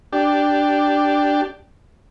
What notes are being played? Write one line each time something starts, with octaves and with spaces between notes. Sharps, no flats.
D4 G4